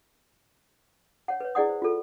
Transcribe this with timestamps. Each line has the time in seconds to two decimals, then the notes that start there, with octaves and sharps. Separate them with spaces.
1.28 C#5 F#5
1.41 B4 C#5
1.55 E4 G#4 D5 F#5 D#6
1.69 C5
1.82 F4 A4